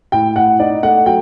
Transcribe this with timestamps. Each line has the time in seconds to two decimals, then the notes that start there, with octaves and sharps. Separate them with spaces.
0.12 A2 G5
0.36 A2 F#5
0.59 D#4 D5
0.83 A3 F#5
1.06 F#3 G5